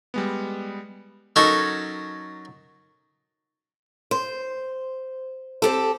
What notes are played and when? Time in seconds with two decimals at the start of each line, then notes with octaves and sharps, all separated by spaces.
0.14 G3 G#3 B3
1.36 F#3 C#4 D#4 A4 A#4
4.11 C5
5.62 C4 G4 A4